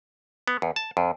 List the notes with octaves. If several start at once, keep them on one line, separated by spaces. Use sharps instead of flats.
B3
E2
A5
F2